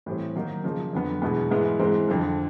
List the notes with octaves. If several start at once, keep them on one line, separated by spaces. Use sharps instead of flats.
A2 E3 G3 C4
D#3 F#3 A#3 D#4
C#3 F3 A#3
F2 D3 F#3 B3
E2 B2 G#3 B3
G#2 E3 G#3 B3 E4
G#2 E3 G#3 C4
F2 D3 F3